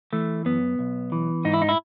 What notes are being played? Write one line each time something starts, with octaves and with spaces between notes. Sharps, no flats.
E3 A3
F#2 B3
B1
E3
G#2 D#4
E4
D#4
E4